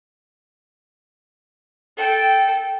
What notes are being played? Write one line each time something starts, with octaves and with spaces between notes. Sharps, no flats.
A4 G5